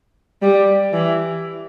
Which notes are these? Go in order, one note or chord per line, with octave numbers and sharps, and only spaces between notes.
G3
E3